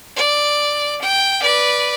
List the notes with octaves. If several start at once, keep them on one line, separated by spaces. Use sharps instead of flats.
D5
G5
B4 D5